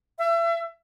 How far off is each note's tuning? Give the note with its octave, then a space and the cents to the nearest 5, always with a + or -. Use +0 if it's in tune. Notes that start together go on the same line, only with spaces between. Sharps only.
E5 +35